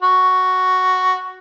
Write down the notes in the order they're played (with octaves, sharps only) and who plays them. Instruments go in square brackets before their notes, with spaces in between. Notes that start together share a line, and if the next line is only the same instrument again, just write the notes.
[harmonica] F#4